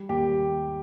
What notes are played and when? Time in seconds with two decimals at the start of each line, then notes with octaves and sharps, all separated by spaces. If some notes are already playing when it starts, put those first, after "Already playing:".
Already playing: G3
0.09 D#2 G4